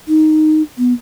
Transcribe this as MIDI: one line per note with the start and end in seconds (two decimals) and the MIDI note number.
0.08 0.62 63
0.78 0.93 59